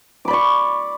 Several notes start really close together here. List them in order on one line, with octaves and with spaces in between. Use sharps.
D6 B5 D5 C#6